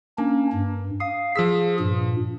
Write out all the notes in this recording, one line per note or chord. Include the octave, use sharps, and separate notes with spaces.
A#3 C#4 D4
G2
F5 D#6
F3 G#4 E6 B6
G2 A#2